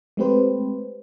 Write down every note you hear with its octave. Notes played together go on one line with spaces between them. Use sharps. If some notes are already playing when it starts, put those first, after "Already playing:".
G#3 A3 C4 G4 B4 C5